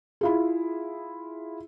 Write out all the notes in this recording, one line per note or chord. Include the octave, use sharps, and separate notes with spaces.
E4 F4 G#4